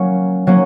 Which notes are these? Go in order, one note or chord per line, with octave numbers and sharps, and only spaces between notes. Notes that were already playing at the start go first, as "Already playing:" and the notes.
Already playing: F#3 A#3 C#4
F#3 A#3 C#4